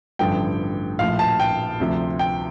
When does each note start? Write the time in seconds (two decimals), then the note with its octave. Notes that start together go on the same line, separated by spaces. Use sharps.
0.19 A1 G2 D3 F3 G5
0.99 A#1 A2 F3 F5
1.19 A5
1.40 G5
1.80 D2 C3 F3
2.19 G5